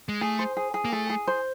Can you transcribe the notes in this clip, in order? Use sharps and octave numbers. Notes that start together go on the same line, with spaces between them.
G#3
A3 G#4
C5
G#4
G#4
A#3
A3 G#4
G#4
C5